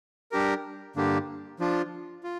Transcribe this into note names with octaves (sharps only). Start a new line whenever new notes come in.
G3 D4 G4 A#4
G2 D3 A#3 D4 G4
F3 D4 F4
F4